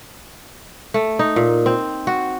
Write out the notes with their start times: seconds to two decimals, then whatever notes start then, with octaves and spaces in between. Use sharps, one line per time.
0.94 A3
1.19 D#4
1.36 A#2
1.66 C4
2.07 F#4